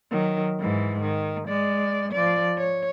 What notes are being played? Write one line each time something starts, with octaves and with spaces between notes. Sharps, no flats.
D#3 F#3
G#2 E3
D#3
G#3 D5
F3 D5
C#5